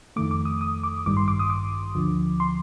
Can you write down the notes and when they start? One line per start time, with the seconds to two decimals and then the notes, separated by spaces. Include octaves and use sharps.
0.16 F2 D#3 A3 D6
0.31 D6
0.45 D#6
0.61 D#6
0.83 D6
1.06 A1 G2 D#3 G3 D6
1.17 C6
1.28 D6
1.39 D#6
1.50 D6
1.95 D2 D3 F3
2.40 C6